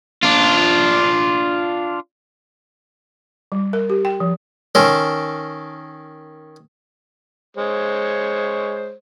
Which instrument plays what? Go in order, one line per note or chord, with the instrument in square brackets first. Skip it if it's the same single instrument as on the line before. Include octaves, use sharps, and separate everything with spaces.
[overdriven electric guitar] D4 F4
[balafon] G3
A#4
G4
G5
F3
[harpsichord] D#3 C#4 A4 A#4 C6
[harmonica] G#3 C5 C#5